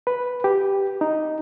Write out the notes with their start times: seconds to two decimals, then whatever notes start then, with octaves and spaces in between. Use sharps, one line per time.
0.07 B4
0.44 G4
1.01 D#4